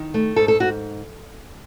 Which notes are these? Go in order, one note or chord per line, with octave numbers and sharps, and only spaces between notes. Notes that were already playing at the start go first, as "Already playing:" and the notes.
Already playing: D#3
A3
G#2 A4
A4
G#2 F#4